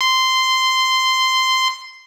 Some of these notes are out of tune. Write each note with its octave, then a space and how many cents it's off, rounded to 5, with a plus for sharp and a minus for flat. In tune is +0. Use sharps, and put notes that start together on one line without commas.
C6 -10